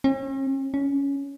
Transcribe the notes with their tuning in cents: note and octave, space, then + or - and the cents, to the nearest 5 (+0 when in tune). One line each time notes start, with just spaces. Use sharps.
C#4 -45
C#4 +10